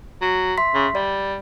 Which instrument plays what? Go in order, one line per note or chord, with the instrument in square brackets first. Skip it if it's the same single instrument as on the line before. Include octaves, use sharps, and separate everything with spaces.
[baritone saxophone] F#3
[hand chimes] E5 C6 B6
[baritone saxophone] C#3
[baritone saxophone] G3 [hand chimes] D5